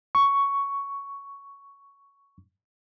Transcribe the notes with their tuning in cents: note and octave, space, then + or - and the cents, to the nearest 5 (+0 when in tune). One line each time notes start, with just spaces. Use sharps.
C#6 +10